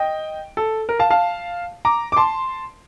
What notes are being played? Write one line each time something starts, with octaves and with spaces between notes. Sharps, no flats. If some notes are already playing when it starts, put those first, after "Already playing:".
Already playing: D#5 G5
A4
A#4
F5 A5
F5 A5
A#5 D6
D6
A5 C6